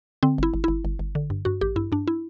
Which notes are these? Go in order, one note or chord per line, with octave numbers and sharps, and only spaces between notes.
D3 C4
G1 E4
G1
G1 E4
G1
G1
D3
G2
G2 F#4
A1 G4
G2 E4
G2 D4
E4